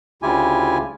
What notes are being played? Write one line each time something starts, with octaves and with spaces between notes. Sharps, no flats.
D2 C#3 E4 F4 G4 G#5